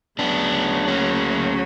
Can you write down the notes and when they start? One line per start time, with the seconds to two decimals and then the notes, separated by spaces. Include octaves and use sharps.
0.19 D2 C#3 F#3 B3 D4
0.88 A#3 C#4